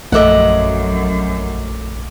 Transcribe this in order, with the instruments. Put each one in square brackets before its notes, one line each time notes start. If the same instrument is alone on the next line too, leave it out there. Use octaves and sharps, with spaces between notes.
[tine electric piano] A#1 D6 [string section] F#2 [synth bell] A3 A4 [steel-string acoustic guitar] D#5 E5 F#5